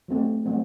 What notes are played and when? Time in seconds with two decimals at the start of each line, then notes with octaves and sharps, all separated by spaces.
0.08 F#3 A3 C4
0.46 F#3 A3 C4